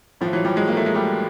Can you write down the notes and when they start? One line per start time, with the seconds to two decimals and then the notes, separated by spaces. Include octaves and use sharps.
0.21 A2 E3 F3
0.33 E3 F#3
0.45 F3 G3
0.56 F#3 G#3
0.68 A#3
0.77 A3
0.86 G#3
0.95 G3 A3